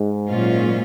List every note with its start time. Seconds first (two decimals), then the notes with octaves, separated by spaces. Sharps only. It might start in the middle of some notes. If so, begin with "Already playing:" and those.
Already playing: G#2
0.30 A#2 F#3 C#4 F4